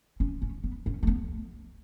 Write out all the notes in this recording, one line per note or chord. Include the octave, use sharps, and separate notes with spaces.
C#4
C#4
B3
C#4
A3
B3